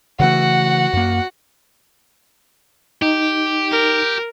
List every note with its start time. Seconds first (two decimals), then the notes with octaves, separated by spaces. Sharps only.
0.20 C#3 E3 A3 F#4 F#5
0.93 F#2 A#3
3.02 D#4 G4
3.72 A#4